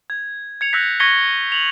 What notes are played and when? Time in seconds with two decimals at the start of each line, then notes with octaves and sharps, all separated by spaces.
0.10 G#6
0.61 G#6 C#7 F7
0.73 E6 F#6 G6 A#6 B6
1.00 C#6 G#6 A#6 B6 C#7 G7
1.52 F7 F#7